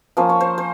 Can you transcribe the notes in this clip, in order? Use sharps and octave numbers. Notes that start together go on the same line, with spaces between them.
F3 A#3 C#4 C5
C#5
C5
C5